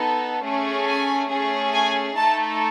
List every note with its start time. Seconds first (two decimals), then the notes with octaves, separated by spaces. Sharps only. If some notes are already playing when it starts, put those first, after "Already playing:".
Already playing: B3 D#4 A4
0.44 A3 C#4 G#4
0.87 G#5
1.30 A3 C#4 G#4
1.73 G#5
2.16 A3 D#4 A4 A5